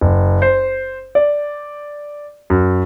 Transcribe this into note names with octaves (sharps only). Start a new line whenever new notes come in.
F#1
C5
D5
F#2